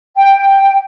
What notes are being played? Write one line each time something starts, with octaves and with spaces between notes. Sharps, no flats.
G5